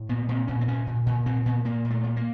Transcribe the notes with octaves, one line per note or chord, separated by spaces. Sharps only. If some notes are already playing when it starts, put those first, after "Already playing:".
Already playing: A2
A#2 B3
A#2 C4
A#2 C#4
C4
A#2 C#4
A#2
A#2
A#2 C4
A#2 B3
A#2 A#3
A#2
A3
A#2
A#3